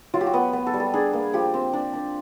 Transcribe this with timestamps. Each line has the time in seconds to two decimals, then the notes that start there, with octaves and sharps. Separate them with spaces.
0.14 F#3 F4
0.21 G4
0.27 F#4
0.34 B3
0.53 B3
0.67 A4
0.74 G3
0.80 A4
0.94 D4 G#4
1.13 A#3
1.33 F3 G4
1.54 C4
1.74 D4
1.93 D4